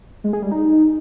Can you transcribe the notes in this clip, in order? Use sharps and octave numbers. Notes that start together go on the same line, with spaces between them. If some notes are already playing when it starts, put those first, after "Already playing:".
G#3
G#4
G3
D#4